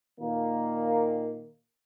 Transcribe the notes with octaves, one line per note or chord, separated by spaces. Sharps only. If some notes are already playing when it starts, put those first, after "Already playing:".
A#2 D#3 A#3